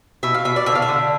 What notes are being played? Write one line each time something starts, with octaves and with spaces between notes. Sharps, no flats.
B2 E5
F5
B2 E5
D5
D3 E5
F5
E5
D3